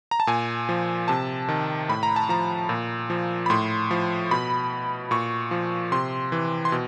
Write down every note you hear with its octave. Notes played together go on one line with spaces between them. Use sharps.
A#5
A5
A#2 G#5
F3
C3 A5
D#3
A2 B5
A#5
A5
F3 A#5
A#2
F3
B5
A2 C6
F3
B2 B5
A#2 C#6
F3
C3 C6
E3
C6
B2